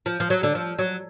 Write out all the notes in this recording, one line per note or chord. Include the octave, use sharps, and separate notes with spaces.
F3
F3
F#3
D3
F3
F#3